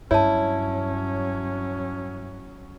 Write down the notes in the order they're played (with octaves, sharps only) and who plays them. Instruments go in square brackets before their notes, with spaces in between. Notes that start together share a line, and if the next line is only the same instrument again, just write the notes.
[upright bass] G2 [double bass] F#3 C#4 [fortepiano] E4 [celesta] C#5 E5 A5